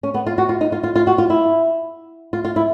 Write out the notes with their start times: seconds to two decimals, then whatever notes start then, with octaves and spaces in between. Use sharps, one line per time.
0.03 C#4
0.14 B3
0.27 F4
0.38 F#4
0.49 F4
0.61 D#4
0.72 F4
0.83 F4
0.96 F4
1.07 F#4
1.18 F4
1.30 E4
2.33 F4
2.45 F4
2.56 E4